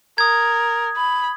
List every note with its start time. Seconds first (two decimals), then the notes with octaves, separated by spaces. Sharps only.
0.18 A#4 D#6 G#6
0.97 B5